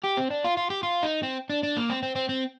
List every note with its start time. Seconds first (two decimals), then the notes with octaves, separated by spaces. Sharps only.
0.04 G4
0.17 C4
0.30 D4
0.44 F4
0.57 F4
0.70 G4
0.83 F4
1.03 D#4
1.23 C4
1.50 D4
1.63 D4
1.77 A#3
1.90 C4
2.03 C4
2.15 C4
2.29 C4